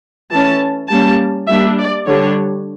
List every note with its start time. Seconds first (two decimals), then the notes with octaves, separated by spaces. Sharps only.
0.30 E3 A3 C#4 A5
0.89 G3 A#3 C#4 A5
1.48 G3 A#3 D4 E5
1.78 D5
2.06 D3 G3 D4 C#5